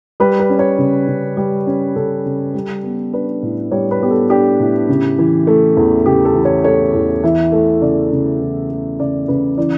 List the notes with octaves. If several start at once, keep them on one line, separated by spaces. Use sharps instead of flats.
G3 B4
B4
C#4
C#5
C#3
C#3
G3
C#4
C#3 A4
C#3
G3
B3
D4 B4
A2
G3 C#5
B4
B3 G4
A4
D4 G4
A2
C#3
E3
A3
E2
C#3 G4
A4
E3
C#5
A3 C#5
E2
E3 E5
A3
C#3 D5
C#3
E3
A3
C#3 D5
C#3 B4
E3 D5